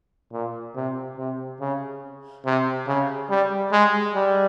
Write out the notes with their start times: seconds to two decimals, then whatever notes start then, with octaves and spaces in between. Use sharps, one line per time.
0.32 A#2
0.76 C3
1.18 C3
1.60 C#3
2.45 C3
2.87 C#3
3.30 G3
3.72 G#3
4.15 G3